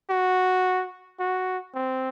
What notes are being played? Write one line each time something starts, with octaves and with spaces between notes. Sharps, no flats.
F#4
F#4
C4